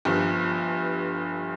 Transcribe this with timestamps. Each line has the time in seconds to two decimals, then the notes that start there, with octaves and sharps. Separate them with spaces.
0.05 G1 G2 F3